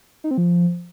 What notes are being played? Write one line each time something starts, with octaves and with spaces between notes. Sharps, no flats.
D#4
C4
F3